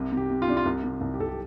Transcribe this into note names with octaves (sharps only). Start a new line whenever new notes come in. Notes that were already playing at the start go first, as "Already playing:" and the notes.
Already playing: C2 C3
C3
G4
C3
F4
C3 D4
F4
C2
C3
C2
G4
C2 A4
G4